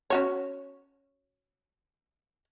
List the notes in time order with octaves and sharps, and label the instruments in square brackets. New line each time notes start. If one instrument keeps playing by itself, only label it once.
[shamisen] C#4 F#4 C#5